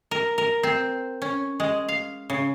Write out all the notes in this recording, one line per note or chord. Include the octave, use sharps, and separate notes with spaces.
A#4
A#4
C4
C#4
G#3
F5
C#3